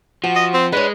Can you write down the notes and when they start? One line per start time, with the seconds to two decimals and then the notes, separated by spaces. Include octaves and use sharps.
0.24 F3 F#4
0.36 D#5
0.54 C4
0.72 G#3 D4 B4 C#5